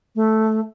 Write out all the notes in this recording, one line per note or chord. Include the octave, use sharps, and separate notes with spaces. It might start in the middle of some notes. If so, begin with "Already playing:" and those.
A3